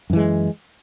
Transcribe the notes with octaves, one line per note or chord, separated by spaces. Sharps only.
F#2 E3 G#3